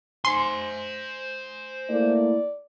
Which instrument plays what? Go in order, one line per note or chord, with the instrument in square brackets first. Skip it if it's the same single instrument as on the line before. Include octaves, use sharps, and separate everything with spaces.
[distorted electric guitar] C5 G#5 [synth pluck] C6
[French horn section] A3 A#3 E4 [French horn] D5